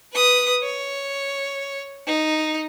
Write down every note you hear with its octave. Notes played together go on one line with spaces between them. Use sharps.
B4 D#6
C#5
D#4